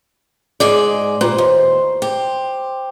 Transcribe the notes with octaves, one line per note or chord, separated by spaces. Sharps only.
G#2 G#3 D5
A#2 C5
D#2
G4